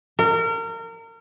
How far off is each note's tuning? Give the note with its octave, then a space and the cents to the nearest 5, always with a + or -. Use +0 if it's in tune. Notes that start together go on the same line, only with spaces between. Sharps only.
A#4 -30